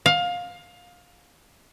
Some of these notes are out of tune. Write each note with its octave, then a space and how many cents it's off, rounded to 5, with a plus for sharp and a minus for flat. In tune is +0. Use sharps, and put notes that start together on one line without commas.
F5 +20